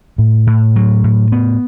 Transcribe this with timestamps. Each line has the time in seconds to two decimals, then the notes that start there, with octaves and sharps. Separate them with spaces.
0.18 A2
0.47 A2
0.76 F#3
1.04 A2
1.32 B3